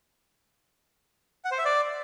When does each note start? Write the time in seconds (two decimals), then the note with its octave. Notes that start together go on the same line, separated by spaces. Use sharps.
1.45 F#5
1.51 C5
1.58 E5
1.65 D5